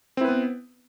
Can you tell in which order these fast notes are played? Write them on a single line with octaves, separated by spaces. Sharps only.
C4 E4 B4 B3